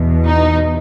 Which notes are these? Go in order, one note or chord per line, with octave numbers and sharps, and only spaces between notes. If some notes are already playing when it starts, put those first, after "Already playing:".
Already playing: E2 B2
D#4